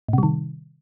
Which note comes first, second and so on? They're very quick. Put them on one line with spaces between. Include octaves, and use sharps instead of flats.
A2 C3 G3 D#3